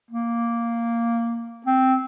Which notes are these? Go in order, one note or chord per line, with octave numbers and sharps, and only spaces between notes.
A#3
C4